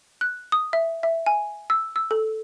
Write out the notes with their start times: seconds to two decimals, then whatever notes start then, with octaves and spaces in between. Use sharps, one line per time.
0.21 F#6
0.52 D#6
0.73 E5
1.03 E5
1.26 G#5
1.70 E6
1.96 E6
2.11 A4